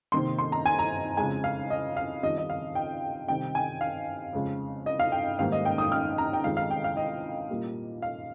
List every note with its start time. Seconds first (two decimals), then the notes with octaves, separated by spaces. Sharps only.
0.12 C3 D#3 A#3 C6
0.39 C6
0.52 A#5
0.66 G#5
0.79 A#5
1.17 F2 C#3 G#3 G#5
1.44 F5
1.70 D#5
1.97 F5
2.22 F2 D#3 G3 D#5
2.38 D#5
2.50 F5
2.75 G5
3.28 C3 D#3 G3 G5
3.55 G#5
3.81 F5
4.33 F2 C#3 G#3
4.86 D#5
4.99 F5
5.12 G5
5.39 G#2 D#3 G3 A#3 F5
5.52 D#5
5.65 G5
5.78 D#6
5.92 F6
6.18 A#5
6.33 G5
6.44 F2 D#3 G#3 F5
6.57 F5
6.70 G5
6.84 F5
6.97 D#5
7.50 A#2 G3 A#3
8.02 F5